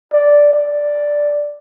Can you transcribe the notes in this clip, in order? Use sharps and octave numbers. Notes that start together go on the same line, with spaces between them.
D5
D5